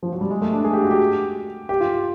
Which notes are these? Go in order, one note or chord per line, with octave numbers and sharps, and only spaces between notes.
F3
F#3
G3
G#3
A3
D4
G#4
G4
F#4
G4
G4
F4